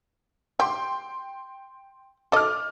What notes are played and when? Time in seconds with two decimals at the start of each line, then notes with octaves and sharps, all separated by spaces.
0.60 G4 G5 C6
2.32 A4 D#5 D6 F6